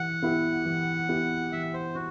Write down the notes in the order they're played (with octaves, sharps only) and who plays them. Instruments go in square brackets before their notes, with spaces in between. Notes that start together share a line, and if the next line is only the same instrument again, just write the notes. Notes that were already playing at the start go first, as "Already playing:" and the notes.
Already playing: [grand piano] E3 E4 G4 [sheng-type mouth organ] F#5
[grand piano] B3 E4 G4
E3
B3 E4 G4
[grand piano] E3 [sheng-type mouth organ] E5
[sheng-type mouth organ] C5
[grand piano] B3 [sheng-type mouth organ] F#4